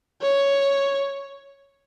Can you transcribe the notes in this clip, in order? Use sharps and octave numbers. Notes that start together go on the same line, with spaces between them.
C#5